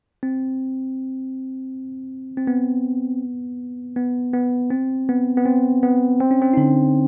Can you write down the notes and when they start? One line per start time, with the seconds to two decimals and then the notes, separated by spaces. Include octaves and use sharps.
0.23 C4
2.37 C4
2.47 B3
3.96 B3
4.33 B3
4.71 C4
5.09 B3
5.37 B3
5.46 C4
5.83 B3
6.21 C4
6.31 C#4
6.42 C4
6.54 D#4
6.57 D3 D4